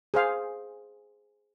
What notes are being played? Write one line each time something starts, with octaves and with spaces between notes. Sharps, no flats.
G#4 C5 F5